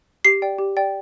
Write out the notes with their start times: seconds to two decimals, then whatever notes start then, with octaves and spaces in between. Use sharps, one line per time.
0.25 G4 C7
0.42 D5 G5
0.59 G4
0.77 D5 G5